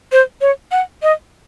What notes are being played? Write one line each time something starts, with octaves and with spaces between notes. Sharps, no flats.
C5
C#5
F#5
D#5